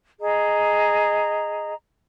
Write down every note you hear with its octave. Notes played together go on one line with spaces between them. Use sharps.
G#4 D#5 A#5